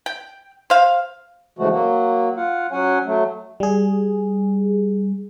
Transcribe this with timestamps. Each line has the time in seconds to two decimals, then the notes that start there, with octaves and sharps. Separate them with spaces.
0.06 G5
0.70 C5 F5
1.59 C#3 E3 F3 G#3 A3 F#4
1.71 F#3 A#3 F#4
2.37 F4 F5 F#5
2.72 F#3 C#4 C#5 F#5 G#5
3.06 F#3 A3
3.60 G3 G#4